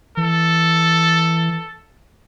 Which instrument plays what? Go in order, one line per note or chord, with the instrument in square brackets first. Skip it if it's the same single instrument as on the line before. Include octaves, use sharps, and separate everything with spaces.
[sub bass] E3 [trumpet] A4